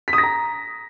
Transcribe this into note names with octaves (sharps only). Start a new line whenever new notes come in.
B6
D#6
A#6
A#5